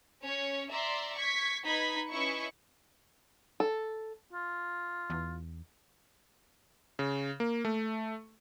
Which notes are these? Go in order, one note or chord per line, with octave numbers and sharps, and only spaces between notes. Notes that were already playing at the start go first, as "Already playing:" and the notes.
C#4 C#5
D5 E5 A#5 C6
C#6 G#6 B6
D#4 B4 B5 G#6 B6
C#4 E4 B4 D#5 C#6 C#7
A4
F4
E2
C#3
A#3
A3